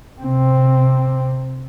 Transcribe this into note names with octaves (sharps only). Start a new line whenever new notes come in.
C3 C4